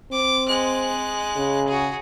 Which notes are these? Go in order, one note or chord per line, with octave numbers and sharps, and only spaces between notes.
C4 D6
G#3 F#6
C#3
F#4 G#4